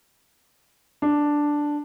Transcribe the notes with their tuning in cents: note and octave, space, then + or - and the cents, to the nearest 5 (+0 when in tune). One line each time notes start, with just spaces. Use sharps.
D4 +0